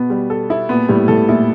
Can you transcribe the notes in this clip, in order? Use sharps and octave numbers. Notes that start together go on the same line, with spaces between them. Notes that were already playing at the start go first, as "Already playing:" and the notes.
Already playing: B2 B3
G3
A4
E4
A#2 B3
A2 G3
A2 A4
A#2 E4